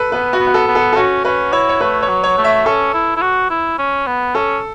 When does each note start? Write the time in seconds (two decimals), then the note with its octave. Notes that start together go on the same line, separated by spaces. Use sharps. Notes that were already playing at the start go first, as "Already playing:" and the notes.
Already playing: A4 B4
0.12 B3 B4
0.33 F#4
0.40 B3
0.47 F#4
0.54 A4
0.68 B3
0.75 A4
0.93 A4
0.96 C#4 F#4
1.25 C#4 B4
1.53 E4 C#5
1.69 C#5
1.81 A3 B4
2.02 C#5
2.09 F#3
2.24 C#5
2.38 A3
2.44 E5
2.66 C#4 A4
2.94 E4
3.17 E4
3.22 F#4
3.50 E4
3.78 C#4
4.07 B3
4.35 C#4 A4